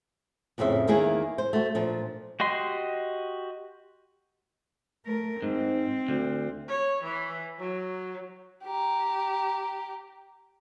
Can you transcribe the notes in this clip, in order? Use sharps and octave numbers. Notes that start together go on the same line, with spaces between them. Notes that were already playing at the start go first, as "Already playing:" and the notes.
F2 A2 C#3 C4 E5
E2 D#3 A#3 E4 G#4 A#4
C5
A3 F#4
A#2 F3 D4
F#4 G4 D#5 C6
A3 A#4
G#2 C4
D2
C#5
E3
F#3
G4 A#5